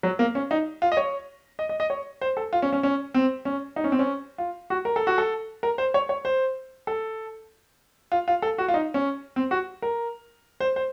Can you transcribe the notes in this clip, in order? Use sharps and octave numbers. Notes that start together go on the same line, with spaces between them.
F#3
A#3
C#4
D#4
F4
D#5
C#5
D#5
D#5
D#5
C#5
C5
A4
F4
C#4
C#4
C#4
C4
C#4
D#4
C#4
C4
C#4
F4
F#4
A#4
A4
F#4
A4
A#4
C5
C#5
C#5
C5
A4
F4
F4
A4
F#4
F4
D#4
C#4
C4
F#4
A#4
C5
C5